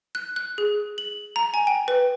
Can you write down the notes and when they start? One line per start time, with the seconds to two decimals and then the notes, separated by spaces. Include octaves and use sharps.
0.15 F#6
0.36 F#6
0.58 G#4
0.98 F#7
1.36 A#5
1.54 G#5
1.67 G5
1.88 B4